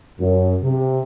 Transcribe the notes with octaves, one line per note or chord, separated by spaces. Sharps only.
F#2
C3